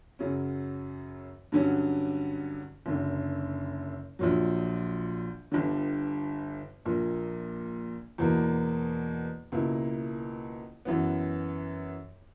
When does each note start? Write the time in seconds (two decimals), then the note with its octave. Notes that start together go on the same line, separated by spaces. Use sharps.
0.19 F#2 C#3 F#3 C#4
1.52 G2 D3 F#3 C#4
2.86 F#1 F#2 D3
4.19 A#1 A#2 F#3
5.52 G1 G2 D3
6.85 A#1 A#2 A#3
8.18 E2 B2 A#3
9.52 C#2 B2 A#3 E4
10.85 F#2 E3 B3